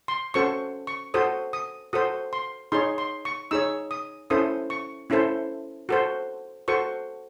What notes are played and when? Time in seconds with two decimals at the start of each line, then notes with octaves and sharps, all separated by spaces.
0.08 C6
0.34 C#4 F#4 A4 C5 C#6
0.87 C#6
1.14 F#4 A4 C5 D#6
1.53 D#6
1.93 F#4 A4 C5 D#6
2.33 C6
2.72 D#4 G#4 C#5 C6
2.98 C6
3.25 C#6
3.51 D#4 G#4 C#5 E6
3.91 D#6
4.30 C#4 E4 A4 C5 D#6
4.70 C#6
5.10 C#4 E4 A4 C5
5.89 F#4 A4 C5
6.68 F#4 A4 C5 C#6